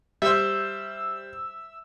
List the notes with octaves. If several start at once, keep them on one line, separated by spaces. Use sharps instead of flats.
G3 C5 E5 E6